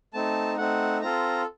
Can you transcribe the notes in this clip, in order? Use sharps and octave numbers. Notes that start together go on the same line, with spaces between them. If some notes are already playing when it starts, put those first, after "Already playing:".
A3 C4 D#4 A5
A3 C4 D#4 F#5
C4 F4 A4 A#5